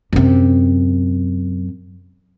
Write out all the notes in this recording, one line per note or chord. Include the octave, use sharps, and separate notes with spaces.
F#2 C3